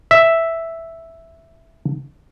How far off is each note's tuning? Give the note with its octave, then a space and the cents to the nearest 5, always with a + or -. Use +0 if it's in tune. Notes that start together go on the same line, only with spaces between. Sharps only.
E5 +0